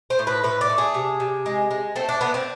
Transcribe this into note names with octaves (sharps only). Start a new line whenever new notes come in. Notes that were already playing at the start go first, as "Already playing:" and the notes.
C5
A2
B4
A2 B4
D5
A3
G#4
C3
C3
G#3
G#3
A3 C4
D4
D3 B3
C4